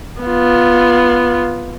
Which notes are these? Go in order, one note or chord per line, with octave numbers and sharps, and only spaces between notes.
B3 F4